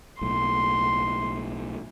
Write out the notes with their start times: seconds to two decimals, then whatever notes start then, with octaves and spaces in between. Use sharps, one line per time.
0.21 B1 A2 C6